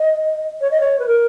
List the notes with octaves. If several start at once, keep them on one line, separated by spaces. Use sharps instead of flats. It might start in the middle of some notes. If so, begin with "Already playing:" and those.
Already playing: D#5
C#5
D#5
C#5
B4
A#4